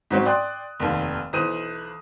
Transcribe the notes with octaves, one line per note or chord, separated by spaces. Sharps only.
G#2 F#3 C4 C#4
D5 G5 C6 D#6 F#6
F1 D#2
B1 E3 C5 D#6 D#7